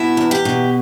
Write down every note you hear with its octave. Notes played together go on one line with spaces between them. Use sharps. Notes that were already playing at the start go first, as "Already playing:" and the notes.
Already playing: B2 E4
E2
G4
B2